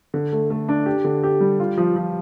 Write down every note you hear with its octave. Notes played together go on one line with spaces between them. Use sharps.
D3
A3
A3
D4
G4
D3
G4
G3
F4
F3
F3